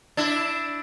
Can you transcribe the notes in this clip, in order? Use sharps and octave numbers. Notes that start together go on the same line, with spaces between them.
D4 E4